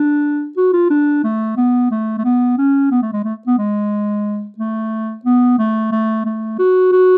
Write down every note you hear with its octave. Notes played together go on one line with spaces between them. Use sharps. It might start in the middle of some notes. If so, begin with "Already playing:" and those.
Already playing: D4
F#4
F4
D4
A3
B3
A3
A3
B3
C#4
B3
A3
G#3
A3
B3
G#3
A3
B3
A3
A3
A3
F#4
F#4